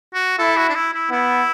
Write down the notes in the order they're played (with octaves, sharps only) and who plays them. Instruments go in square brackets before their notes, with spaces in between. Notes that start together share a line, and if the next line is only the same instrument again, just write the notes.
[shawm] F#4
[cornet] E4 [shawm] A4
[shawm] F#4
D4
E4
E4
[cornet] B3 [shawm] E4